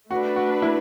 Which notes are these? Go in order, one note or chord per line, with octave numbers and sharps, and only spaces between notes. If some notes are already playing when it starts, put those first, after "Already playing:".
A3 D4 F#4 B4
F#4
E4